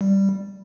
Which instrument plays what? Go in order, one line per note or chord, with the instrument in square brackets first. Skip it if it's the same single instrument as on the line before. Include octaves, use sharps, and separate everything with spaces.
[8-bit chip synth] G3